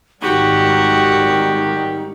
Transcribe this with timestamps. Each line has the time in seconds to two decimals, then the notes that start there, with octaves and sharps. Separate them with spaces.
0.22 G#1 D#3 G3 D#4 F#4 G4